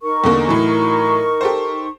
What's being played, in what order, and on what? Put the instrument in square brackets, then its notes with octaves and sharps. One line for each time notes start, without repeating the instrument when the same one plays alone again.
[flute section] D#4 A#4 C#6
[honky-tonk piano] E2 D3 A#3
A2 E3 F#3
G4 A4 C5